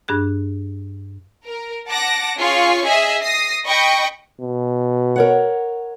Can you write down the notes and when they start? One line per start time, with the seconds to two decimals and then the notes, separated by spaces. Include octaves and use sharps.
0.08 G2 D4 G#4 F#6
1.45 A#4
1.89 F#5 A5 D6 A#6
2.37 C#4 F4 G#4 F5 G#5 C#6
2.83 G#4 D#5 E5 G#5
3.22 D#6 A#6 C7
3.66 D#5 G5 B5 C#6
4.41 B2
5.16 A#4 C#5 F#5